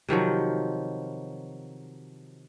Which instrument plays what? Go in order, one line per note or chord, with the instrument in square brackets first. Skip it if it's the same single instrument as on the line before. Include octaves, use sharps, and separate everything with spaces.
[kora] C3 D#3 F3 F#3